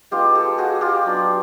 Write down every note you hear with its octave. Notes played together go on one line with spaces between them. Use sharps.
G#3 B3 D#4 F4 G4
G4 A4
F#4 G#4
F4 G4
F#3 B3 D4 F4